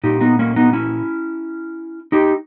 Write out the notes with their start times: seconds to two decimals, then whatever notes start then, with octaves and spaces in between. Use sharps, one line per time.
0.04 A#2 D#4 G4
0.21 B3 D#4
0.39 A#3 C#4
0.56 B3 D#4
0.73 C#4 E4
2.12 D#4 G4